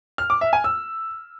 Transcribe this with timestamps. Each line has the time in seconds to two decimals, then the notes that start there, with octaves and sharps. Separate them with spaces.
0.18 F6
0.30 D6
0.41 E5
0.53 G#5
0.64 E6